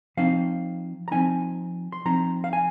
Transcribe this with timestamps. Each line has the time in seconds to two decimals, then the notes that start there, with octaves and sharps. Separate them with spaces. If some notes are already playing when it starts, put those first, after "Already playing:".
0.17 F3 C4 D#4 F5
1.08 A#5
1.11 F3 C4 D#4 G#5
1.92 C6
2.05 F3 C4 D#4 A#5
2.44 F5
2.53 G#5